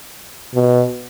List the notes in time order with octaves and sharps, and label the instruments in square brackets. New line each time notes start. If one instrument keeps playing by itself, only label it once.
[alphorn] B2